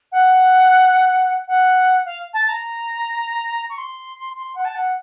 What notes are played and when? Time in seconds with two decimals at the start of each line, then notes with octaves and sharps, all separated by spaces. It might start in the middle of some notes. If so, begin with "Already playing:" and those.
0.11 F#5
1.47 F#5
2.05 F5
2.33 A5
2.48 A#5
3.69 C#6
3.77 C6
4.35 C6
4.55 F#5
4.64 A5
4.74 F#5